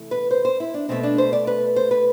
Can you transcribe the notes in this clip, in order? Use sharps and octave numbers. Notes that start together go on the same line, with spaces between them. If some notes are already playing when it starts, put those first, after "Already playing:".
Already playing: C3 E3 A3
B4
C5
C5
E4
D4
B2 A3 C4
D4
C5
D5
B4
C5
B4